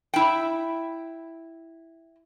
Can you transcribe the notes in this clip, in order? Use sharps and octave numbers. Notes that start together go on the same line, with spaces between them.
E4 G5